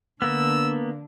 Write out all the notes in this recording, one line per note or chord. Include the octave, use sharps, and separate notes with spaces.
D3 A#3 B3 E6